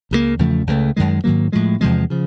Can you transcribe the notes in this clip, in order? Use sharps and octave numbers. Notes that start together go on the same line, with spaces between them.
C#2 C#3 F#3 A#3
E2 C#3 F3 A3
C#2 C#3 F3 A3
F#2 D#3 G#3
G#2 D#3 F#3 A#3
A2 F3 G#3
E2 C3 F3 G#3
C#3 F3